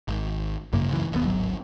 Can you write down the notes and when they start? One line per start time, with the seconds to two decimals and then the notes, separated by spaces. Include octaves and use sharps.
0.08 G#1
0.73 G#1 F#2 C#3 A#3
0.89 C#2 F#2 E3
1.12 E1 D#2 B3
1.26 D1 G#1 F#3